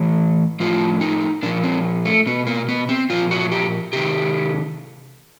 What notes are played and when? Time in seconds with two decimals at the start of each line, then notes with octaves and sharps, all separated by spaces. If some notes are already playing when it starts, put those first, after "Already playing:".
Already playing: A2 E3
0.60 A2 F3 F4
1.01 D#4
1.43 A#2 F3 D4
1.64 C4
2.05 A3
2.26 B2 B3
2.47 A#3
2.68 B3
2.89 C4
3.09 A#2 F3 F4
3.31 F#4
3.52 G4
3.93 C3 D#3 G4